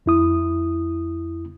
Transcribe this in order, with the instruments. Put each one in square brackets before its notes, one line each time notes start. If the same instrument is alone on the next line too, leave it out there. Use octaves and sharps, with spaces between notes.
[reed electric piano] F2 E4 D#6